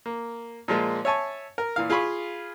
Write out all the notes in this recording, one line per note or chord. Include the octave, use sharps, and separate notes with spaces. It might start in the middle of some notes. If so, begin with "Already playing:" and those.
A#3
A#2 F3 G#3 A#3
C#5 E5 G#5 A5 C#6
A#4
A#2 E3 F5
F4 G#4 F5 B5 C#6